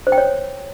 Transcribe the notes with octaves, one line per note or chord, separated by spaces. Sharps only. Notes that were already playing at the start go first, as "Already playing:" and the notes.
C5
G5
C#5